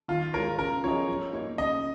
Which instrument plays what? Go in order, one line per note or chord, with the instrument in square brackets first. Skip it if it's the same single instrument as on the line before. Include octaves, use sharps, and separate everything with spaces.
[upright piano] D#3 [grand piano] F4
[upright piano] G#3 F4 C#5 [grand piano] A#4
[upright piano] C#3 [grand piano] A#4
[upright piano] F3 C#4 G#4 D#5 [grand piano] C#5
[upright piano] F3
A#3 D#4 C#5
[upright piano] C#3 [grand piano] D#5